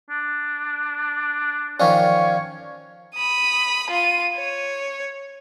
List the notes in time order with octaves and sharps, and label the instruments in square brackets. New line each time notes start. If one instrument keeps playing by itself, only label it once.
[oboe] D4
[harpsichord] D#3 F3 C#4 [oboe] C#5 [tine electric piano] D5 F5 C#6
[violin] B5 D#6
F4 D#7
C#5